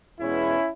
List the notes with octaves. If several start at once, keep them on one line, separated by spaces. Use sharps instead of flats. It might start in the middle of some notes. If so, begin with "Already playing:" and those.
E2 B2 G#3 B3 C#4 E4